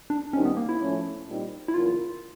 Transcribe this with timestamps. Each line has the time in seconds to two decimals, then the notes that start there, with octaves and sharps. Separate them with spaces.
0.10 D4
0.33 D#2 D#3 G3 C4 C#4 D#4
0.45 B3
0.57 A#3
0.69 E4
0.80 A2 F3 A3 C#4
1.27 A#2 G3 C4 D#4
1.68 E4
1.73 E2 C#3 F#3 A#3 F4